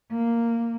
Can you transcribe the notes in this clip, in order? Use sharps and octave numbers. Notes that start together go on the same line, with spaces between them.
A#3